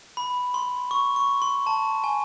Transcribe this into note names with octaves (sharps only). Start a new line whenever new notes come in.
B5
C6
C#6
C#6
C6
A5
G#5